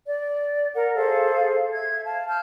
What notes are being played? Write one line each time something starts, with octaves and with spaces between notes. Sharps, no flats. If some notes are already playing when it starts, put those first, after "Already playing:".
D5
A#4 F#5
G#4 A4 C5 F5
E5 G#6
F5 A5
A5 F6 G6